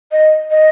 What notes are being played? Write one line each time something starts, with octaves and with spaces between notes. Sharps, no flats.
D#5
D#5